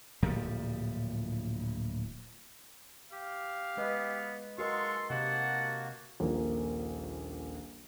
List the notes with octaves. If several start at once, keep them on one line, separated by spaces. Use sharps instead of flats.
D1 A#2 F3 G3
G4 F5
G#3 B3 B4 D#5
G#3 F#4 A4 A#4 D#5 F5 C6 C#6
C3 A#3 F#4 D#5 F#5 A5
D#1 A#1 A#3